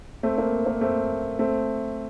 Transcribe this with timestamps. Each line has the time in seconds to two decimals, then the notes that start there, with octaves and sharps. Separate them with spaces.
0.23 A3 C4
0.38 A#3
0.66 A#3
0.81 A3 C4
1.39 A3 C4